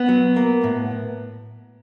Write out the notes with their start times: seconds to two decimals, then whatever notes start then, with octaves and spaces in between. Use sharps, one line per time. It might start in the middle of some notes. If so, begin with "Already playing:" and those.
Already playing: B3
0.09 F#3
0.36 A#3
0.64 A2